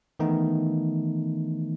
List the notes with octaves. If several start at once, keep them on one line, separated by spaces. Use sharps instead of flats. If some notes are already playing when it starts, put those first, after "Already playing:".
D#3 E3 A3 B3 D#4